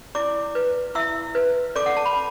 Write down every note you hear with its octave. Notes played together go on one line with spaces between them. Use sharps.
E4 D5 D6
B4
E4 E5 E6
B4
A4 D5 D6
F#5
A5
B5